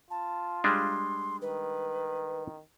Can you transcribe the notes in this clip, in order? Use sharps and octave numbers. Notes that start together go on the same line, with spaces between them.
F4 A5
G3 G#3 D4 C6
D#3 B4